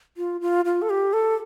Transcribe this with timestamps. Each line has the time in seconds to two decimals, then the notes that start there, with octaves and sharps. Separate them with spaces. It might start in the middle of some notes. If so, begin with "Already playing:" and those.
0.17 F4
0.41 F4
0.65 F4
0.82 A4
0.90 G4
1.13 A4